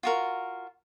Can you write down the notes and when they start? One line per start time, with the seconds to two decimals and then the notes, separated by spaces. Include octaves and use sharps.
0.03 F4 F#4 A#4